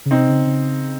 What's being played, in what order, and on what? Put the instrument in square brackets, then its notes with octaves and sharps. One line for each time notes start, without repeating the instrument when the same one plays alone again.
[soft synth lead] C#3
[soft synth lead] C3 [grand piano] C4 D#4
[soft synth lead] C#3
C#3